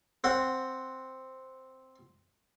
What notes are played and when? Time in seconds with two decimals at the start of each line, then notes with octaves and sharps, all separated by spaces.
0.24 C4 F#5